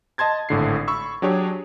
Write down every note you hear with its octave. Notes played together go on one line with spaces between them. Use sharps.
D#5 A5 C6 G#6 A6
G#1 A2 D3 C7
B5 C#6 E6
F#3 D4 G4 G#4 C#5